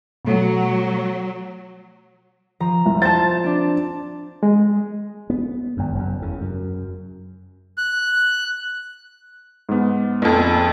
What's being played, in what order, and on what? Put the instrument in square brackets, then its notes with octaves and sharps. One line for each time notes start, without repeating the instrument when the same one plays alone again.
[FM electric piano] B2 A3 [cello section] F#3
[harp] F3 A#5
[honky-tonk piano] C2
[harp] C5 [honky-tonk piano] A5 A6
[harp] C4 D4
[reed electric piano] G#3
[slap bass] B3
G#1 F#2
F#1 F#2
E2 C#3
F#2
[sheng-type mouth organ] F#6
[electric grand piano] G#2 B3
[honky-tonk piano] A#1 F2